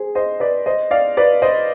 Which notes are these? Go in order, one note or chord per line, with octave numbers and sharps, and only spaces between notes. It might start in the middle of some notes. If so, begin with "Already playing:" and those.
Already playing: G#4 C5
C5 D#5
B4 D5
C5 D#5
D5 F5
B4 D5
C5 D#5